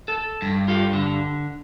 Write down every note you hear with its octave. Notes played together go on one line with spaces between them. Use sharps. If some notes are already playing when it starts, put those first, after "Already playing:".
A4
G2
F4 G4 A4
D3